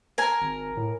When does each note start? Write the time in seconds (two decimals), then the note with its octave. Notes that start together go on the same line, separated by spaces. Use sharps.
0.18 A#4 G#5
0.41 G#1
0.77 A2